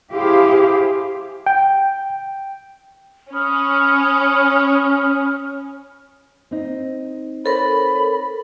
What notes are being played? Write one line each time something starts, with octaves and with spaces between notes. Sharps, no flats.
E4 G4 G#4 C5 F5
G5
C#4 B5 D#6 F6
C4 D#4
A4 A#4 C5 C#5 B5